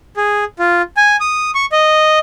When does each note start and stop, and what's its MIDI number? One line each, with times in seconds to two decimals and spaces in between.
0.17 0.44 68
0.59 0.82 65
0.97 1.17 80
1.20 1.51 87
1.55 1.65 85
1.72 2.19 75